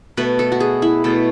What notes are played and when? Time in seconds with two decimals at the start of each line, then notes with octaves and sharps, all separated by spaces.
0.17 B2 A3 B4
0.39 A4
0.52 F#4
0.60 G#4
0.82 E4
1.04 B2 A3